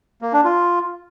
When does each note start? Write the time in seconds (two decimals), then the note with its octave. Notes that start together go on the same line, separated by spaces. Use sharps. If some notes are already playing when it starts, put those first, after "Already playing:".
0.22 A#3
0.33 D4
0.44 F4